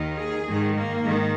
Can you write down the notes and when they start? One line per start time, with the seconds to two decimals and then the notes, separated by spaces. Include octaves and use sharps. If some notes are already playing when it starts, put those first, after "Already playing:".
Already playing: D#2 D#3
0.17 G#4
0.46 G#2 D#3
0.74 A#3
1.02 G#2 D#3